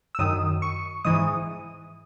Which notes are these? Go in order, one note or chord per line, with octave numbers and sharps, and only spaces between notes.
E6
F#2 D#3 D#6
C#6
G#2 E3 D#6